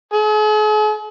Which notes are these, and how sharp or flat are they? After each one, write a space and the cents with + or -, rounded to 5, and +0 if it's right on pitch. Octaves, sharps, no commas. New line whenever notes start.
G#4 +45